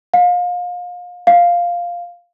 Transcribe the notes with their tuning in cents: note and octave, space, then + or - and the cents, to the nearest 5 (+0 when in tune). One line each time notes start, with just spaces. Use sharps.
F5 +30
F5 +0